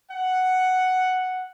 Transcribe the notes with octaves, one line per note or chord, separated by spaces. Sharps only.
F#5